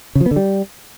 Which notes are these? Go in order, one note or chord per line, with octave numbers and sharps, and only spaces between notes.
C#3
F3
B3
D3
G3